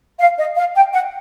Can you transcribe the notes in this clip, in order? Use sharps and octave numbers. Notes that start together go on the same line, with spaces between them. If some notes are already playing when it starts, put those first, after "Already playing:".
F5
D#5
F5
G5
F#5